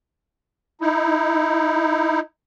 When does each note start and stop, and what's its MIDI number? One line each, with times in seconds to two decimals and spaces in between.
0.81 2.20 63
0.81 2.20 64